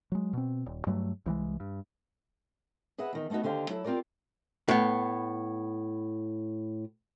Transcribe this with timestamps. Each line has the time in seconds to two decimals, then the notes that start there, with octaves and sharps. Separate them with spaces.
0.12 F#3 G#3
0.33 B2 C4
0.66 D#1
0.87 G2 F#3 G3 A3
1.26 C2 E3 G3 G#3
1.60 G2
2.98 G#4 B4 D#5 E5 F#5
3.13 E2 D#3
3.30 A3 B3 C4 D#4 F#4
3.43 D#2 D3 G4 C5 F5
3.69 F#3 E4 A4
3.84 C4 F4 G4 A#4 D5
4.69 A2 B3